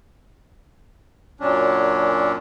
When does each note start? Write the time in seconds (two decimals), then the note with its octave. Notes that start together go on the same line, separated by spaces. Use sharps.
1.40 F#2 A#2 F#3 C#4 D4